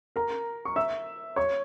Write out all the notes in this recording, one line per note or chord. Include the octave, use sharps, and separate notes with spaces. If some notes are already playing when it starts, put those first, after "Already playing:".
A#4 A#5
C#6
E5 E6
C#5 C#6